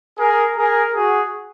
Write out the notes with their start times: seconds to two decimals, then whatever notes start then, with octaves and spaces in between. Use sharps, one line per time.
0.18 G#4 A#4
0.56 G#4 A#4
0.94 F#4 G#4